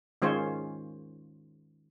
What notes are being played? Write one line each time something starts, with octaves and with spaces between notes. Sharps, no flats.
D#3 G#3 C#4 F4 C5 C#5